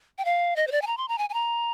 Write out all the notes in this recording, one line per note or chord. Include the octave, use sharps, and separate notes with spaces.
G5
F5
D#5
C5
D5
G#5
A#5
C6
A#5
G#5
G#5
A#5